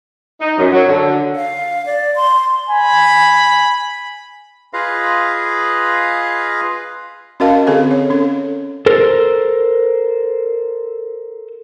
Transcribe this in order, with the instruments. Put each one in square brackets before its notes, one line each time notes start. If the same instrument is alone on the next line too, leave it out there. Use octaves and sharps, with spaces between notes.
[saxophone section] D#4
F#2
F#3
D3
[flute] F5
D5
C6
[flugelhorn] G#5 [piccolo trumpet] B5
[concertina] F4 G#4 B4 D#5 F5
[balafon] C#4 F#4 A#4 D#5 F5 A5
D3 C4 G#4 A4 F5 G#5
C#5
C#4 A4
[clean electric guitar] A4 A#4 C5